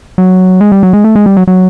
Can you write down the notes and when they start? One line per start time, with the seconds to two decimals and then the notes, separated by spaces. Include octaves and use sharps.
0.18 F#3
0.61 G#3
0.72 G3
0.83 F#3
0.93 G#3
1.04 A3
1.16 G#3
1.26 G3
1.37 F#3
1.47 F#3